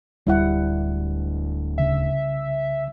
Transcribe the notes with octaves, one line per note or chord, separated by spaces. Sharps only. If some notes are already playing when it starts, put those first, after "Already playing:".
D1 D2 G3 E4 F#5
C2 C#3 E5